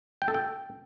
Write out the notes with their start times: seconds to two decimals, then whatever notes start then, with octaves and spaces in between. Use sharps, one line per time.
0.22 G5
0.28 A4
0.34 G5